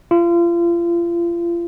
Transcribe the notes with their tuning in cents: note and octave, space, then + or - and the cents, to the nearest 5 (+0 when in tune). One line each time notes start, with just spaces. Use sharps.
F4 -35